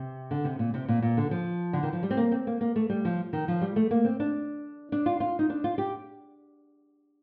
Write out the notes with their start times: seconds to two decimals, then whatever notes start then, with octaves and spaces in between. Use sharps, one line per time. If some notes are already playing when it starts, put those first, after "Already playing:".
Already playing: C3
0.31 D3
0.44 C3
0.59 A#2
0.74 C3
0.88 A#2
1.02 A#2
1.17 D3
1.31 F3
1.73 D3
1.83 D#3
1.93 F3
2.03 G3
2.10 C4
2.17 A#3
2.32 C4
2.47 A#3
2.61 A#3
2.76 A3
2.90 G3
3.05 F3
3.33 D#3
3.48 F3
3.62 G3
3.76 A3
3.91 A#3
4.05 C4
4.20 D4
4.92 D4
5.06 F4
5.20 F4
5.39 D#4
5.50 D4
5.64 F4
5.78 G4